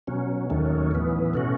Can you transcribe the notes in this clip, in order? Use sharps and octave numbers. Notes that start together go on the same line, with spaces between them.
B2 F#3 C#4
D#2 D#3 F#3 A3 C#4
A2 E3 B3
B2 A3 C#4 F#4